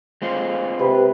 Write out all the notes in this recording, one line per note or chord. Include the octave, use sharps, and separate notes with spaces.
G#3 C4 F4
C3 B4